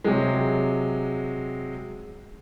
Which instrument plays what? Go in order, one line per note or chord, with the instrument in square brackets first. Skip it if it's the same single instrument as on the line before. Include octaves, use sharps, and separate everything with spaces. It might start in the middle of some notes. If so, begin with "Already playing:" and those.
[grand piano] C3 F#3 G#3